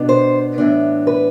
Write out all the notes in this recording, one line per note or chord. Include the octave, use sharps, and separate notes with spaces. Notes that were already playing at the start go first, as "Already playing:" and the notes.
Already playing: B2 B3 D4
C5
A2 E3 B3 D4
B4